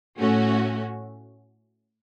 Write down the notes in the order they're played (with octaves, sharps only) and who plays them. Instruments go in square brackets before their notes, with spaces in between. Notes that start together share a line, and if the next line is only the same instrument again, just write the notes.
[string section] A2 A3 C#4 F#4